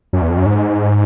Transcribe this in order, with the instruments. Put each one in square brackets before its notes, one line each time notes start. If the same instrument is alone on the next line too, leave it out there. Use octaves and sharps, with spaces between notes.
[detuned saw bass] F#2
E2
F2
F#2
G#2